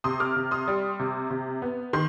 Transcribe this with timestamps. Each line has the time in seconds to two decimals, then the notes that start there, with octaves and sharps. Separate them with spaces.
0.04 C3 C6 D#6
0.20 D6 F6
0.36 C3
0.51 C6 D#6
0.68 G3
1.00 C3
1.30 C3
1.62 B3
1.93 D#3 C6